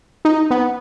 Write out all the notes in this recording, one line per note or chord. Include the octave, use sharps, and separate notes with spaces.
D#4
B3